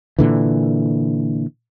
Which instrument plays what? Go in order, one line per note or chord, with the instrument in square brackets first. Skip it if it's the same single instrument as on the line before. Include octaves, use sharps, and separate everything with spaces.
[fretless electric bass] A#2 D3 E3